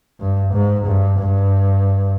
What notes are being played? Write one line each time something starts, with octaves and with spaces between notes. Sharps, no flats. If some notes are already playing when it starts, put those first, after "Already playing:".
G2
G#2
G2
G2